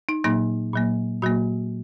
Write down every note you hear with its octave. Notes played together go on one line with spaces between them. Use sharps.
D#4
A#2 F#3 A#3 D#4
A#2 F#3 A#3
A#2 F#3 A#3 F#4